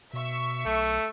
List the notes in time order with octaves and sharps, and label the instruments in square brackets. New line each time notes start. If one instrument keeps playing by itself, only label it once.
[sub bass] B2 [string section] E5 C#6
[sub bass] B1 [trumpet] A3